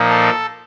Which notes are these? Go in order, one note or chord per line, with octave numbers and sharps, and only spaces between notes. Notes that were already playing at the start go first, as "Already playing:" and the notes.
Already playing: A#2 F3 A#3 D#4
A4